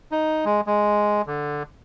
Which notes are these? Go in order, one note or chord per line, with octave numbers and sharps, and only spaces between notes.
D#4
G#3
G#3
D3